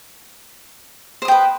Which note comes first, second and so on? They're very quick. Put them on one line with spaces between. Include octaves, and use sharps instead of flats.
C5 D#6 G5 B4